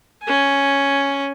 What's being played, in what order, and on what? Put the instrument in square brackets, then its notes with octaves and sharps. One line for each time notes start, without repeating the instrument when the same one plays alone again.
[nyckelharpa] C#4 G#5